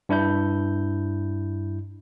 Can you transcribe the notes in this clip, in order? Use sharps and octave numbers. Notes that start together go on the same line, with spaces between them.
G2 D4 E4 G6